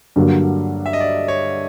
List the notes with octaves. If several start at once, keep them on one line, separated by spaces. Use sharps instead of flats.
G2 D3 F#3 A#3
E5
D#5
D5
C#5